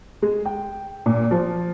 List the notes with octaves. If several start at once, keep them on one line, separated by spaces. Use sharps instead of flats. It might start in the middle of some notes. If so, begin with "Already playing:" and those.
G#3
G5
A#2
F3